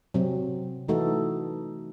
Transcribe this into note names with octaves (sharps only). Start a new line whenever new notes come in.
C3 F#3 C4
E3 A3 D#4 F#4 A4